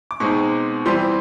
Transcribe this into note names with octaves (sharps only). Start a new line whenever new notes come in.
D6
B2 G#3 C4 D#4 C#6
E3 G3 C4 C6